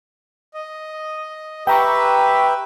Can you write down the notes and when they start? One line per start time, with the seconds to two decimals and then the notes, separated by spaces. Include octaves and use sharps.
0.54 D#5
1.67 G4 B4 E5 G5 A#5 C#6